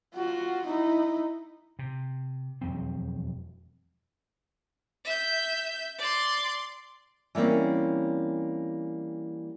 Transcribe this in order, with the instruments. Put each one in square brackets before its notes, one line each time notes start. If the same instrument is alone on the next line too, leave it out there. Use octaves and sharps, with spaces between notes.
[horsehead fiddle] F4 F#4
D#4 E4
[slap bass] C3
E1 F2 F#3 C4
[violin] E5 G6
D5 C6
[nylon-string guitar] E3 G3 A#3 C4 C#4